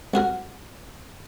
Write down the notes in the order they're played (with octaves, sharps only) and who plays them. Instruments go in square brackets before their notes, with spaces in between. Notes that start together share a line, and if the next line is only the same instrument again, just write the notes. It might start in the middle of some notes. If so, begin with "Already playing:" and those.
[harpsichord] C2 F#4 A#4